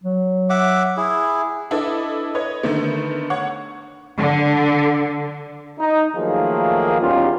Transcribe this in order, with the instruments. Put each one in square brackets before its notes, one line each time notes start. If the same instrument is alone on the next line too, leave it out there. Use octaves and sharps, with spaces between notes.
[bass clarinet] F#3
[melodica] E5 F#5 D6
E4 G#4
[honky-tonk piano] D4 E4 A4 B4 D#5
B4 C#5 D#5
D3 D#3 A3 B3
C#5 F#5 C#6
[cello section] D3
[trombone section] D#4
D#3 F3 F#3 A3 A#3 G#4
E2 G3 C#4 D#4 F4